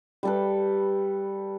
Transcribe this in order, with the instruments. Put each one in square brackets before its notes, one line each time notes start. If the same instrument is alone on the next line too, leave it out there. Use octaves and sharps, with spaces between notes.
[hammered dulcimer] G3 A4 B4